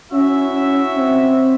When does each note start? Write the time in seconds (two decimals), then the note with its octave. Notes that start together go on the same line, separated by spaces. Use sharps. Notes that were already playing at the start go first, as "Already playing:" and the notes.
0.11 C#4 E4 F#4 E5
0.51 C#4
0.95 C4